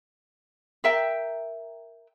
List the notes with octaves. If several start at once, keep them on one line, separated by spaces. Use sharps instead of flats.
A#4 E5 G5